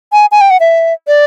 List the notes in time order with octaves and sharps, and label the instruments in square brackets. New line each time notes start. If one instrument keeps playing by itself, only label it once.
[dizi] G#5
G#5
G5
F#5
E5
D5